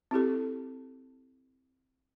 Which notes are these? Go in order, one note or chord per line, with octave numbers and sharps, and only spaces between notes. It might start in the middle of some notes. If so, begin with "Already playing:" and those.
C4 E4 G4 A4